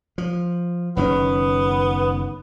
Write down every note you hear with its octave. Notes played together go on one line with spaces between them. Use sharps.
F3
F#1 D#3 B3 C#4